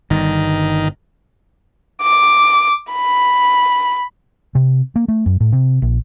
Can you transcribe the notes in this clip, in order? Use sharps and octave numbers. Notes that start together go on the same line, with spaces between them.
G1 G2 D#3
D6
B5
C3
A#3
A3
F#2
A2
C3
A#1